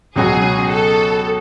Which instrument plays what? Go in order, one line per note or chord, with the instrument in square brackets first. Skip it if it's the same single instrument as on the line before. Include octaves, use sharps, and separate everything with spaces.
[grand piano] C#2 B2 F#3 C#4 F#4 [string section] G#4
[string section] A4